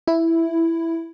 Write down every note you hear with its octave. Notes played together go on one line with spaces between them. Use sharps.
E4